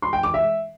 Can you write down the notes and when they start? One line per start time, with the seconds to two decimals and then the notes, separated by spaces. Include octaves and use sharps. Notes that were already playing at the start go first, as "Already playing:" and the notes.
0.02 C6
0.13 G5
0.23 D6
0.34 E5